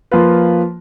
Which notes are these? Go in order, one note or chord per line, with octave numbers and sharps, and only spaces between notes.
F3 A#3 F4 B4